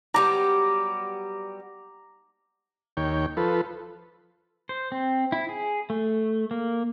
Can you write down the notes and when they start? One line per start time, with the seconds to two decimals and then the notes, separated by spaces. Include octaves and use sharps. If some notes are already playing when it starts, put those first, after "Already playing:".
0.14 F#3 G3 B3 A#5 D6
2.97 D#2 C#5 G5
3.37 F3 A4 B4
4.69 C5
4.92 C4
5.32 E4
5.49 G#4
5.90 A3
6.51 A#3